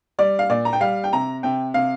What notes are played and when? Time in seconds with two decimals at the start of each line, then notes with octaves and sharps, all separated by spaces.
0.19 G3 D5
0.39 F5
0.49 A#2 D5
0.65 A#5
0.73 G5
0.81 G3 F5
1.04 G5
1.13 C3 A#5
1.43 C3 G5
1.74 C3 F5